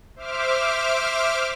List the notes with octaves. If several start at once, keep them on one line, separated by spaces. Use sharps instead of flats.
C5 E5 D6 F6